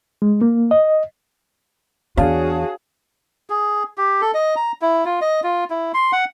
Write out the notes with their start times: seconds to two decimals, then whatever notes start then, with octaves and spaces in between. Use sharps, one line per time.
0.22 G#3
0.42 A#3
0.71 D#5
2.17 E2 D4 F#4 G#4 C#5 F5 A5
3.50 G#4
3.98 G4
4.21 A4
4.34 D#5
4.56 A#5
4.82 E4
5.05 F4
5.21 D#5
5.43 F4
5.70 E4
5.94 C6
6.13 F#5